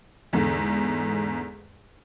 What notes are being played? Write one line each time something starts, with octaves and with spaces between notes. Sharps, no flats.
E2 G#2 D3